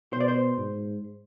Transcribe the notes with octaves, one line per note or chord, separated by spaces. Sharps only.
B2 C5
D5
C5
G#2